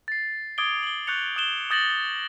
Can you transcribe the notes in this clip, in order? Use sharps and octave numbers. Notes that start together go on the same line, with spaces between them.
A6 C7
D6 D#6 G#6 A6 D7 G7
F#7 G7
C#6 F#6 G6 A6 C#7 F7
D#6 F#6 E7 G7
D#6 G6 A6 A#6 E7 F#7